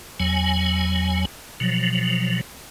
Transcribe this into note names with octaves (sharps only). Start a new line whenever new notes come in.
E2 F#3 G#5
B2 F3 F#3